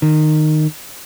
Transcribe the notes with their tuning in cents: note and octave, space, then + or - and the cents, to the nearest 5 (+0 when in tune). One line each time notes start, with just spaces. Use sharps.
D#3 -15